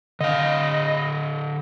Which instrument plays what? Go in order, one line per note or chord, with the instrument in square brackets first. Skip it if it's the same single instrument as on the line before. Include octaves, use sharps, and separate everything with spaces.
[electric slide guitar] D3 F5 [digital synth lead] D#5